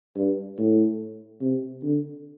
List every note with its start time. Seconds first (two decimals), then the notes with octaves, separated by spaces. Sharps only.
0.16 G2
0.58 A2
1.41 C3
1.83 D3